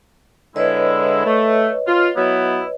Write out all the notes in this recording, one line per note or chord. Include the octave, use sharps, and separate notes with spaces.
D3 G#3 E4 B4 C#5 D#5
A3
F4
F#3 B3 E4